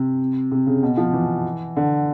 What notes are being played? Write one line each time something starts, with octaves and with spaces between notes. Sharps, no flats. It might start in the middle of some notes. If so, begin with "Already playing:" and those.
Already playing: C3
C3
C#3
B2
F3
E3
D3